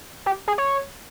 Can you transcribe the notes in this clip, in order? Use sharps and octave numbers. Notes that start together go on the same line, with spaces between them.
G4
G#4
C#5